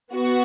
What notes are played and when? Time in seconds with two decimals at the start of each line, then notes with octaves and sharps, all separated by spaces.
0.13 B3 F#4